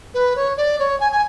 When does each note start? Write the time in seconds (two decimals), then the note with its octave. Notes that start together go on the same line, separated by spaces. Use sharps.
0.14 B4
0.36 C#5
0.57 D5
0.79 C#5
1.00 G#5
1.12 G#5